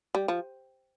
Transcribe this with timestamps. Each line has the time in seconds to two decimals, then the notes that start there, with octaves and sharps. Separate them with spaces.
0.15 G3
0.28 F3